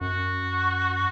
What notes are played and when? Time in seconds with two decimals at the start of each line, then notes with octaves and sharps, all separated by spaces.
0.01 F#2 F#4